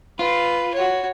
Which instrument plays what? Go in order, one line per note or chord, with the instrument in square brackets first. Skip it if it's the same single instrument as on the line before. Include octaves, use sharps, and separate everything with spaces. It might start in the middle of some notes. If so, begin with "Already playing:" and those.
[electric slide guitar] F4 [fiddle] B4
[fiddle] F#4 C#5